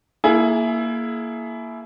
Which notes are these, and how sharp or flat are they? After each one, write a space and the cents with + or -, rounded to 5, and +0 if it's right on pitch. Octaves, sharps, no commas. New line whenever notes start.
A#3 +0 E4 +5 G#4 +35